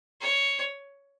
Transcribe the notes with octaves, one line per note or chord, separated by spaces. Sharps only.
C#5